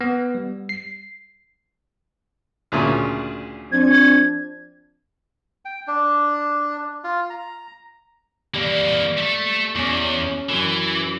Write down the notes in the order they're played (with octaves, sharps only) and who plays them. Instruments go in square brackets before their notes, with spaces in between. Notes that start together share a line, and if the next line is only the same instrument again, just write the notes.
[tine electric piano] B3
G3
C7
[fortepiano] D2 A#2 C#3
[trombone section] F3 C4 D4 [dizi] G#6
[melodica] G5
D4
F4
A#5
[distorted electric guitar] E3 A#3 [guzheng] G3
[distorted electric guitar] A3 A4
[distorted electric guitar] E2 [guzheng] C#4 D5
[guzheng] F#2 [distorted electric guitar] E3